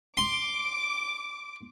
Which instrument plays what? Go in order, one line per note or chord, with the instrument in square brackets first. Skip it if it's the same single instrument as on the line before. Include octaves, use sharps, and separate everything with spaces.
[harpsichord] C6 [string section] D6